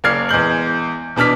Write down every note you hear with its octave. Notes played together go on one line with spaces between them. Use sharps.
F#1 A#3 D5 F6 G#6 C7
E2 G#3 G6 F#7
E2 B2 D4 F6 B6